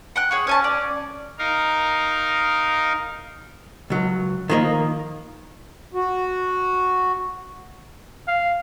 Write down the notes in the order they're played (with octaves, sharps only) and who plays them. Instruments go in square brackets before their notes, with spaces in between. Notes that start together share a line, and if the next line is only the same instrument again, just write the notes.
[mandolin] F#5 G5 F#6
[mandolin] G#4 C#5 F#5 [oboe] C#6
[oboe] C#4 [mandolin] C#5 G#5 A5
[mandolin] D5
[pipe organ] D#4 A#4 F5
[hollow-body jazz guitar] C#2 F#3
D#3 F3 A#3 G#4 A#4 D#5
[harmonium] F#4
[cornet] F5